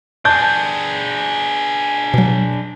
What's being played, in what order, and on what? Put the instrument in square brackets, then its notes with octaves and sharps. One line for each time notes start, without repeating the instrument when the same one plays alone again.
[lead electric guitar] D4 G#4 [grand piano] A5 G6
[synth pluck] B2 F#3